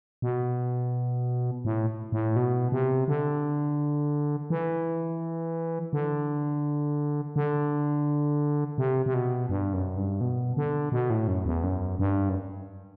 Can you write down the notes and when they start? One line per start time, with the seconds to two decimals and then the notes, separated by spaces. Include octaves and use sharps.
0.22 B2
1.65 A2
2.12 A2
2.36 B2
2.72 C3
3.08 D3
4.50 E3
5.93 D3
7.36 D3
8.78 C3
9.06 C3
9.14 B2
9.49 G2
9.73 F#2
9.97 G2
10.21 B2
10.57 D3
10.92 B2
11.10 A2
11.28 F#2
11.46 E2
11.64 F#2
11.99 G2
12.29 F#2